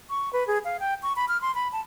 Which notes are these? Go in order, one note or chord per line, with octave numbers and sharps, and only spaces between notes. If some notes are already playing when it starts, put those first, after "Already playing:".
C#6
B4
G#4
F5
G5
C#6
B5
F6
C6
B5
A5